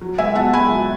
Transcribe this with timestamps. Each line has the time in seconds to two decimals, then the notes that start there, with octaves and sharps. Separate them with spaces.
0.01 F#3
0.18 C#2 E5 G#5
0.35 B2 F#5 A5
0.53 C#2 G#5 B5
0.71 F#3